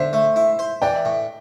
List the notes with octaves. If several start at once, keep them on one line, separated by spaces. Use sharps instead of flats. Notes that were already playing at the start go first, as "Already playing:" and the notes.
Already playing: D3 C5 E5
A3
E4
C5
E3 D5 G5
A2